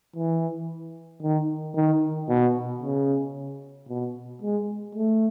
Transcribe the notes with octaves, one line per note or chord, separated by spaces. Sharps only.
E3
D#3
D#3
B2
C#3
B2
G#3
A3